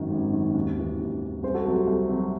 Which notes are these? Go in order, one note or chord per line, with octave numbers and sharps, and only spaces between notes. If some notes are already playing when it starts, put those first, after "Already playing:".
Already playing: G#1 F#2 D#3 F#4
G#1
F#2 D#3
D#2
C#3 E3
D#2
C#3 E3
C2 G#4 C5
F#4 A4
C3 F#3 F#4 A4
F#4 A4
C2
C3 F#3